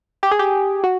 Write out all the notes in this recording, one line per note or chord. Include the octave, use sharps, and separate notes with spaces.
G4
G#4
G4
F#4